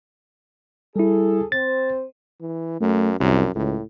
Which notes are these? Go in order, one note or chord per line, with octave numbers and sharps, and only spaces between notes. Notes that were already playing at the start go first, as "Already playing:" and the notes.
G3 E4 G#4 A4
C4 C5 A6
E3
F#2 A3
C2 F#2
C#2 A2